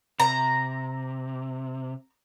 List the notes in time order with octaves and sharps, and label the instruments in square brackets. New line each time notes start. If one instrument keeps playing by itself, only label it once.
[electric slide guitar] C3 [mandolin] A#5